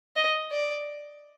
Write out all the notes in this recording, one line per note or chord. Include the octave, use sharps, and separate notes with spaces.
D#5
D5